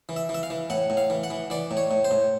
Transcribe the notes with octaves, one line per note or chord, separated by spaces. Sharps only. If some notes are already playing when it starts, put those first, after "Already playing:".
E3
E5
E3
E5
F5
E3
A2 F#5
A2
F5
E3
F#5
E3
E3 D5
A2
C#5
A2
C5
A2